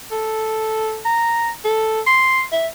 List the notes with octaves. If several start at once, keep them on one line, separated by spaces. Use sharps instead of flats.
A4
A#5
A4
C6
E5